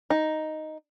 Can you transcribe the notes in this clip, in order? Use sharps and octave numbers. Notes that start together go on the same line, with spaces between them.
D#4